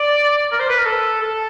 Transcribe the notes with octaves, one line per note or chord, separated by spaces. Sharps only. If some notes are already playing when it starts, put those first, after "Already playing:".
Already playing: D5
A#4
C5
B4
A#4
A4
A4